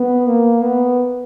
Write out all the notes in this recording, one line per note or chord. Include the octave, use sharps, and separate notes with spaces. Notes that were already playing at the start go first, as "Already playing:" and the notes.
Already playing: B3
A#3
B3